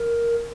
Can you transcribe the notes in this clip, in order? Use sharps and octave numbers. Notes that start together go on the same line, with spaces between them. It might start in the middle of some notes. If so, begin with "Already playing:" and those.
Already playing: A#4